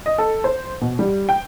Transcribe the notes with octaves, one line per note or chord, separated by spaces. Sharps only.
D#5
A4
C5
B2
G3
G5